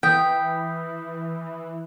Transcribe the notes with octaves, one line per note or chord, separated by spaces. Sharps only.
E3 G5 D#6 G6 B6